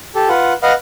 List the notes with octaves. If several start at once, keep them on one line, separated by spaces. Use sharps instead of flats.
G4 A4
F4 B4 F#5
B4 D#5 F5 F#5